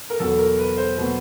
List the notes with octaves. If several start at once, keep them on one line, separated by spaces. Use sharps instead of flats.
A#4
E2 B2 F#3 B3 A4
A#4
B4
C5
B2 F#3 B3 B4